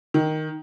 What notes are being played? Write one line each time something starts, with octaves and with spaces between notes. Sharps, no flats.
D#3